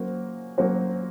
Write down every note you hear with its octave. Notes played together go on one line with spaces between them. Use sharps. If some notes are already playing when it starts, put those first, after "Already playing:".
Already playing: F#3 A#3 C#4 F#4 C5
F#3 A#3 C#4 F#4 C5